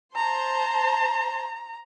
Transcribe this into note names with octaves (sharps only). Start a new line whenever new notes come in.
C5 A5 A#5 C6